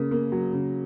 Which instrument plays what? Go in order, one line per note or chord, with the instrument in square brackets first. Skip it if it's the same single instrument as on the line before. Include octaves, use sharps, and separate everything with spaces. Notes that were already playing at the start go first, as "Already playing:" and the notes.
Already playing: [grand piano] C#3 A#3
A#3
F#3
C#3